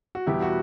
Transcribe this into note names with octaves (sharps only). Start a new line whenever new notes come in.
F#4
E2 B2 G3 B3 E4 G4
F#4